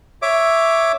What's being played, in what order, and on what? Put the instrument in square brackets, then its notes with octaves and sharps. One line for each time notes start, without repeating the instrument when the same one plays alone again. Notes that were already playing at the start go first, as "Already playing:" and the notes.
[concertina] C#5 E5 D6